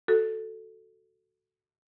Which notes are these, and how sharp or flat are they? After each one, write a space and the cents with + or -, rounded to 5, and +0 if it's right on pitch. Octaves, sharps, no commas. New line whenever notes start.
F#4 +0 A4 +0